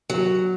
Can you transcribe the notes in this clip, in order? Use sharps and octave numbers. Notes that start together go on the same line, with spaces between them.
F#3